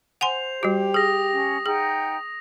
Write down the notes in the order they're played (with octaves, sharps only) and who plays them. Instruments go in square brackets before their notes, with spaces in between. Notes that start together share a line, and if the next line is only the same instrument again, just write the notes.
[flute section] C5 [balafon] F#5 G#5 C6 [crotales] F7
[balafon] G3 F#4 [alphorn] G4
[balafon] G#4 [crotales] D#6 A#6
[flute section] C#4
[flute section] D#4 F#5 G5 [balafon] G#4